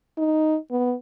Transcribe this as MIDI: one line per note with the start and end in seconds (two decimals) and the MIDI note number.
0.18 0.57 63
0.71 0.94 59